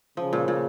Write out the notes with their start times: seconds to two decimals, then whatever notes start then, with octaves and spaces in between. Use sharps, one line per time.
0.17 C#3 F3
0.33 A#2
0.48 A#2